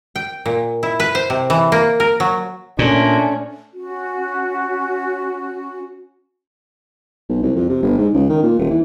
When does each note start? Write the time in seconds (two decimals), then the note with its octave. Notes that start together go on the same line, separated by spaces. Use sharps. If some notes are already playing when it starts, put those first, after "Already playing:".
0.16 G5
0.46 A#2
0.83 E4
1.00 B4
1.15 C5
1.30 C3
1.50 E3
1.72 A#3
2.00 A#4
2.20 F#3
2.79 A#2 A3 C#4 D4
3.74 C#4 F#4
7.29 B1
7.42 C2
7.56 F2
7.69 C3
7.82 G1
7.98 G#2
8.14 C#2
8.29 D#3
8.43 A#2
8.59 D#1
8.70 E3